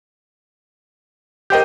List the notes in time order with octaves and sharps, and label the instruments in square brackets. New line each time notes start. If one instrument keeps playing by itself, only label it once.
[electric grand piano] G4 C5 D#5 [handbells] A#4 G5 G6